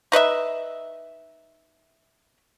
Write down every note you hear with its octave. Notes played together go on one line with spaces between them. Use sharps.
D#4 B4 D#5 E5